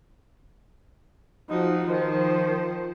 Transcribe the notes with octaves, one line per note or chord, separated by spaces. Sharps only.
F3 D#4 F#4
D#3 F3 C5